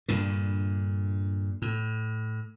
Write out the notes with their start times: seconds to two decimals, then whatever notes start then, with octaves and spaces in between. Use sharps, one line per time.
0.08 G2 A#2 D3
1.62 A2